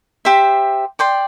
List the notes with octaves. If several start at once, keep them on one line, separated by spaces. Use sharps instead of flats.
G4 C5 E5
D5 G5 C6